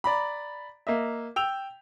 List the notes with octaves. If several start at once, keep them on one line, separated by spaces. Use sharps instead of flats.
D5 A#5 B5
A#3 D#5 E5
G5 E6 F7